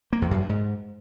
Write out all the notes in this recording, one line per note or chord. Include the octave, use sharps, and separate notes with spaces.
A#3
E2
F#2
G2
G#2